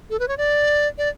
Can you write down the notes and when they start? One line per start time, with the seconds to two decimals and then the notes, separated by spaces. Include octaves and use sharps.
0.10 A4
0.19 B4
0.28 C#5
0.38 D5
0.98 D5